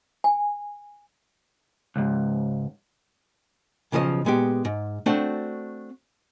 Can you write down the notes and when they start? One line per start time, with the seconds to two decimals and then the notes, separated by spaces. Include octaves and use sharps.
0.24 G#5
1.96 C#2 G#2
3.92 B1 C#3 F3 A4 D#5
4.25 A#2 G#3 B3 G4
4.65 G#2
5.06 A3 C4 D4 F#4